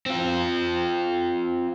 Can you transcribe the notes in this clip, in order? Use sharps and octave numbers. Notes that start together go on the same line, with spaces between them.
C4 F4